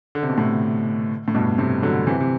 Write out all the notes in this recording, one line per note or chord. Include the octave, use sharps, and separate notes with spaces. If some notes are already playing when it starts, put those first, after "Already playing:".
D3
C3
B2
A2 C3
A2
G2 B2
A2 C3
D3 F#3
C3 E3
C3